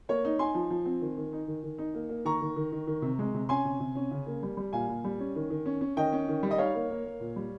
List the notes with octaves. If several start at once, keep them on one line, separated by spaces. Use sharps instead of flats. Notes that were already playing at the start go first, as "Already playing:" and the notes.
A#3 C#5
D#4
D#4 G#5 C6
F3
F3
C4
D#3
D#3
D#4
D#3
D#3
D#4
A#3
A#3
D#3 A#5 C#6
D#3
D#3
D#3
D#3
C3
G#3
C3
C#4 G#5 C6
C3
C3
C#4
C#3
A#3
G3
G3
A#2 F5 G#5
A#2
G3
C#4
D#3
D#3
C#4
C#4
D#3 D#5 G5
C#4
D#3
G3
D#5
D#4 C#5 F5
A#3
A#3
A#3
A#2
G3